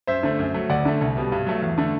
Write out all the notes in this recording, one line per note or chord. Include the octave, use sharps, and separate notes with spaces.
F#2 C5 E5
D3 A3
F#2
F#3 A3
D2 D5 F#5
D3 A3
C2
B2 G3
G2
F#3 A3
E2
D3 A3